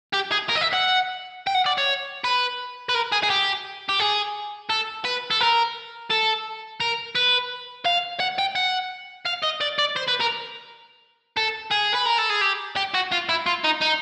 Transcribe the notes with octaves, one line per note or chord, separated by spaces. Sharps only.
G4
G#4
A#4
D#5
E5
F#5
G5
F#5
D5
C#5
B4
B4
A#4
G#4
G#4
G4
G4
G#4
A4
B4
A4
A#4
A4
A#4
B4
F5
F#5
G5
F#5
F5
D#5
D5
D5
C5
B4
A#4
A4
G#4
B4
A#4
A4
G#4
G4
G4
F#4
F4
E4
F4
D#4
D#4